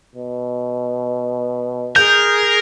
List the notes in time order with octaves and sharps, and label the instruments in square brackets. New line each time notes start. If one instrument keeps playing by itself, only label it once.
[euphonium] B2
[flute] G#4 [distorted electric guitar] A#4 [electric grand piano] G6